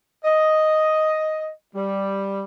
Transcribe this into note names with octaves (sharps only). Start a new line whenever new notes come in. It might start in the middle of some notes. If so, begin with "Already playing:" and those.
D#5
G3